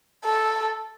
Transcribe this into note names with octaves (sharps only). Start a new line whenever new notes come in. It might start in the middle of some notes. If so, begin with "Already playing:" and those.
A4